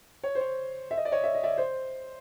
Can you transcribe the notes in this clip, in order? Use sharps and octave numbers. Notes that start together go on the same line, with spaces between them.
C#5
C5
C#5
E5
D#5
D5
C#5 D#5
E5
D#5
D5 E5
C5